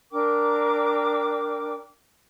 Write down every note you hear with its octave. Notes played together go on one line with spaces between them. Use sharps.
D4 A#4 G5 D6